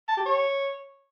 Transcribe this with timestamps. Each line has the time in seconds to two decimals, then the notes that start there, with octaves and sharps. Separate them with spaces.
0.08 A5
0.17 G4
0.25 C#5